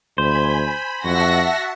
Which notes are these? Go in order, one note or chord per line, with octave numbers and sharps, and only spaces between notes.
D2 C5 G#5 B5
F2 F#4 E5 F#5 A5 A#6